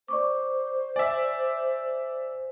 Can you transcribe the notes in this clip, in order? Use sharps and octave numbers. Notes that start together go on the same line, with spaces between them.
C5 D5 C#6 D6
D5 E5 G#5